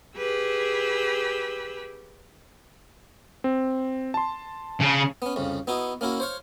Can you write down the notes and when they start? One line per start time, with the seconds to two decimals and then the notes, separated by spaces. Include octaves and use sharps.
0.17 G4 G#4 B4 E6
3.44 C4
4.14 A5 C6
4.81 C#3
5.22 B3 C#4
5.36 C2 F2 C#3
5.67 B3 D#4 E4 F#4
6.01 A#3 C#4 E4 F#4
6.20 C5 C#5 F5